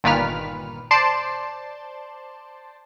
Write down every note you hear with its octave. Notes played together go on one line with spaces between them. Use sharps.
G1 A#2 D#3 B4 F6
C5 D5 A5 C6